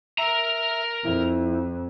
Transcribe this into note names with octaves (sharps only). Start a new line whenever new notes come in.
A#4 E5 A#5
F2 E4